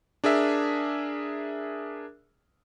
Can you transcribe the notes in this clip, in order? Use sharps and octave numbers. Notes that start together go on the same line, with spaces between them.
D4 G#4 A#4 E5